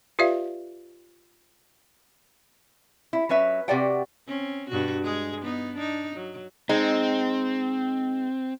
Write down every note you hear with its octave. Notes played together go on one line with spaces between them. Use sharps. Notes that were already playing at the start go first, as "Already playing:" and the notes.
F4 G4 B4 D5 E5 F5
E4
F#3 C#4 B4 E5
C3 F#4 G4 D5 F#5 G5
C4 C#4
G2 B2 F#4
G#3 G#4
B3 D#4
D4 D#4
F#3
G#3 C4 D#4